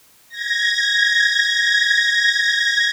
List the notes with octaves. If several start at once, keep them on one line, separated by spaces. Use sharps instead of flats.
G#6 A#6